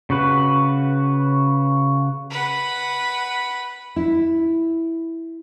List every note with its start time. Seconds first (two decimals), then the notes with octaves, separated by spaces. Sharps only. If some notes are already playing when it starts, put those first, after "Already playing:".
0.10 C#3 F#4 B4
2.30 B4 F#5
3.96 E4